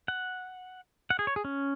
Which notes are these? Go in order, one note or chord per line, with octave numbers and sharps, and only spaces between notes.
F#5
F#5
G#4
C#5
G#4
C#4